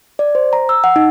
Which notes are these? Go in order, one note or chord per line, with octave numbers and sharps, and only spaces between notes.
D5
C5
A#5
E6
F#5
D#4